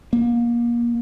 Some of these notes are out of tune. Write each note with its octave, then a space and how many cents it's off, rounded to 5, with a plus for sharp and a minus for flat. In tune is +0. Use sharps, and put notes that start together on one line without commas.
A#3 +25